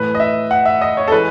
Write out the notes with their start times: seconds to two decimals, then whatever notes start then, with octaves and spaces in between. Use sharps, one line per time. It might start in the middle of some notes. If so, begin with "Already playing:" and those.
Already playing: A2 E3 A3 B4
0.15 D#5
0.20 E5
0.51 F#5
0.66 E5
0.81 D#5
0.97 C#5
1.08 A4
1.12 E3 G#3 B4